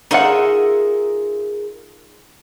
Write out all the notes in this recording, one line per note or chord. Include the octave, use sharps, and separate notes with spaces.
D#4 F4 G#4 A#4 E5 F#5